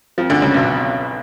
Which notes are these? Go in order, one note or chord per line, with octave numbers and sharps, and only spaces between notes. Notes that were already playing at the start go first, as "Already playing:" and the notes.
F2 F3
D2 D3
C#2 C#3
B1 B2